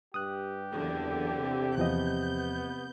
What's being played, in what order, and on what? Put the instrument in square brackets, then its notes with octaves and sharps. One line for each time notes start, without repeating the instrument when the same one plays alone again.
[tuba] G2 [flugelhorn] G4 [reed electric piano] D#6 F#6
[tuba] F#1 [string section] E2 D3
[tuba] C3
[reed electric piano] E2 F3 D#5 [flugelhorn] B3 [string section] G6